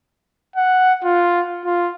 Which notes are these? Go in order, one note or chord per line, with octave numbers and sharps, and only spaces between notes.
F#5
F4
F4